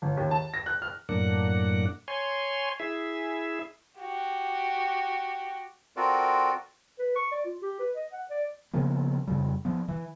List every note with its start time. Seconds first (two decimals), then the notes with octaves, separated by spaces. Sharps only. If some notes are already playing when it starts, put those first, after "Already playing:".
0.02 G1
0.17 D#2
0.31 A5
0.54 A#6
0.66 F#6
0.82 F6
1.09 F#2 A2 A#3 D4 F#5
2.08 C#5 G#5 C6
2.80 E4 G#4 E5
3.99 F#4 G4
5.97 C4 F4 F#4 A4 A#4 D5
6.99 B4
7.16 C#6
7.32 D5
7.45 F4
7.62 G4
7.79 B4
7.95 D#5
8.13 F#5
8.30 D5
8.74 C#3 F3 A#3 B3
9.27 F2 C#3 G3
9.65 F3 B3
9.88 E3